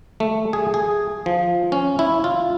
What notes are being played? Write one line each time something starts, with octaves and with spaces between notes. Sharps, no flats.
A3
G#4
G#4
F3
C#4
E4
F4